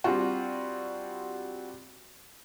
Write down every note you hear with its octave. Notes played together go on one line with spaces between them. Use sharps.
G3 C4 D4 F4 F#4